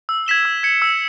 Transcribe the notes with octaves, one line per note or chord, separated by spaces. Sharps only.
E6
G#6 B6 E7 G7
E6
G#6 C#7
E6